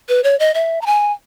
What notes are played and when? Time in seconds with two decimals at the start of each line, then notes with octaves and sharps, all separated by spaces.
0.09 B4
0.24 C#5
0.39 D#5
0.54 E5
0.81 A#5
0.86 G#5